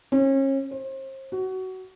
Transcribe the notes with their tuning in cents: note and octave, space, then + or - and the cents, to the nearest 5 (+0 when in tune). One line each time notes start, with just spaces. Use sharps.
C#4 -35
C5 +35
F#4 +20